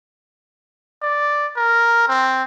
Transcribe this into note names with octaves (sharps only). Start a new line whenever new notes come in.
D5
A#4
C4